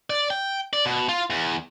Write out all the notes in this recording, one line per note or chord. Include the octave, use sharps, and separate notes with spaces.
D5
G5
D5
B2
F4
E2